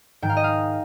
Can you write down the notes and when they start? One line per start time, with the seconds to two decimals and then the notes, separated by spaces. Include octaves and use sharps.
0.22 G#2 D#3 G#3 G5
0.29 F5
0.37 D#5
0.44 F5